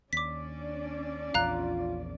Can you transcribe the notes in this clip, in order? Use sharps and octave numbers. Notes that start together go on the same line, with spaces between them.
D#2 C#4 D4 D5 D6 B6
A#1 E2 F4 F5 A#5 F#6